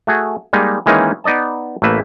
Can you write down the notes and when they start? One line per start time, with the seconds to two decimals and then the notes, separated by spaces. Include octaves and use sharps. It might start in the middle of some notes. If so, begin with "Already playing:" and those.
0.07 A3 F#4 G#4
0.53 G3 G#3 A#3 D#4
0.86 D#3 E3 G#3 A#3 C#4 D#4
1.24 B3 D#4 D5 D#5 A5
1.82 A1 A3 A#3 B4 E5